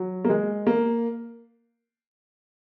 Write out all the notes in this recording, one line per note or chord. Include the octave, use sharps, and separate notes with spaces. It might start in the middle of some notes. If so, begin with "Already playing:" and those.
Already playing: F#3
A#3
G#3
A#3